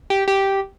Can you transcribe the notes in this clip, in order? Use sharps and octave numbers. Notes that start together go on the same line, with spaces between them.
G4
G4